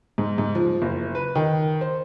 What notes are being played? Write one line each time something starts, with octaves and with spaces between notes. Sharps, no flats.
G#2
G#2
F3
F#1
B4
D#3
C5